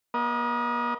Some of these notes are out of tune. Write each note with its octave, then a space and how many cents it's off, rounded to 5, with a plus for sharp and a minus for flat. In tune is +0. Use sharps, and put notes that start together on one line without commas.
A#3 +45 D#5 +0